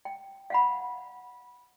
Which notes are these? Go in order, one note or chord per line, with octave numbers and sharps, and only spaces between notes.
G5
F5 F#5 B5